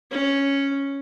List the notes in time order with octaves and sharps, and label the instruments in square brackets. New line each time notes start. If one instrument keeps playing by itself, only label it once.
[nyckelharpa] C#4